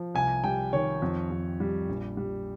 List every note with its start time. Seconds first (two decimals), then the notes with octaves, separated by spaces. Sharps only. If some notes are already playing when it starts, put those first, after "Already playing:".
Already playing: F3
0.14 C2 G#5
0.44 G3 G5
0.73 D#3 C#5
1.02 F2
1.31 F2
1.60 G3
1.89 A#1
2.17 G3